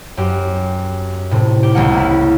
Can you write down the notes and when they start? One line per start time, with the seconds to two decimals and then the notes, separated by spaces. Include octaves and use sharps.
0.17 F#2 G4
1.31 A2 C3
1.63 G4
1.75 C#2 G#3 A#3 F#5
1.93 A#3 E4